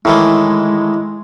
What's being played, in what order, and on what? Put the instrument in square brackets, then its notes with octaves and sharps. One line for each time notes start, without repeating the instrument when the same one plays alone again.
[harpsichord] A2 D#3 E3 [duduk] G#3 [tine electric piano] E4